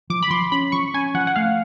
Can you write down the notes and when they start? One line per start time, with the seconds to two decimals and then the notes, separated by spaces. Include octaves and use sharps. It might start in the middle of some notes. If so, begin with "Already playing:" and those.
0.10 F3 D6
0.23 B5
0.30 F3 C6
0.52 C#4 B5
0.72 F3 C#6
0.94 C#4 G#5
1.14 F3 F#5
1.27 F#5
1.36 A3 F5